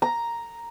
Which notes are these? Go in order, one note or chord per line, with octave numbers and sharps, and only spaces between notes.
A#5